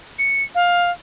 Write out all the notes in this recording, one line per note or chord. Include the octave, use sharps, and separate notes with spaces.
C#7
F5